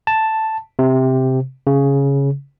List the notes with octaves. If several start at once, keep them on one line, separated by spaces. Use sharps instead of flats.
A5
C3
C#3